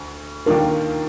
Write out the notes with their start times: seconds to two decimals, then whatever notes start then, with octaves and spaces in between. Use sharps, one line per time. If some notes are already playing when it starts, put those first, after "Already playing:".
Already playing: D2
0.46 D#2 D#3 A#3 D4 F4 A#4